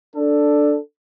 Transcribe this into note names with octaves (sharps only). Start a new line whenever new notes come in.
D4 A4